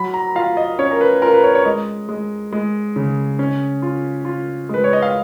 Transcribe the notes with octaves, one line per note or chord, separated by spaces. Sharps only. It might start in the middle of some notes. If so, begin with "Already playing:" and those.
Already playing: F#3 B5
A#5
F4 F5
D#5
C#4 C#5
A#4
B4
F4 A#4
B4
C#5
C#5
G#3 D#5
G#3
G#3
C#3
C#4
F4
F4
G#3 B4
C#5
D#5
F5